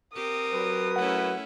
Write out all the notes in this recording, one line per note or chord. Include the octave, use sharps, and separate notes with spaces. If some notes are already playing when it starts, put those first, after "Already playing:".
C4 G4 A#4 D#6
F#3 B4
A3 C#4 E4 F#5